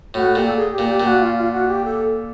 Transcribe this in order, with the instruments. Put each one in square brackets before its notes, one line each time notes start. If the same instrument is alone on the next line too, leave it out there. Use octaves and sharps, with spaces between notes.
[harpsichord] A2 [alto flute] F#4
[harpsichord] A#2 [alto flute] G4
[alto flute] A4
G#4
G4
[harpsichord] A#2
[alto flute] G4
[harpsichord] A#2
[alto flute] F#4
F4
F4
F#4
G4
A4